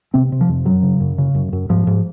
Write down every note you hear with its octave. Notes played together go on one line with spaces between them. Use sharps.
C3 C4
C3
F3
F2
F#2 F#3
C#3
F#2
C#3
F#2
F#2
G#2 F3
G#2